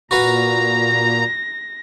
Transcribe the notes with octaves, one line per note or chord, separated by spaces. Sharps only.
A#2 F#4 B4 F5 A#5 A#6